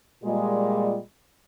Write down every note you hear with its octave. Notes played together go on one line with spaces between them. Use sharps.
A#2 G3 G#3